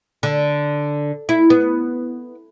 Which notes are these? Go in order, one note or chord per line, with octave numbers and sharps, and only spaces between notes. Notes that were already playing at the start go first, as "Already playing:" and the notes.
D3
E4
B3